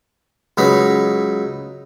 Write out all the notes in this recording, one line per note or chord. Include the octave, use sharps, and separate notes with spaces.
C#2 F#3 D#4 B4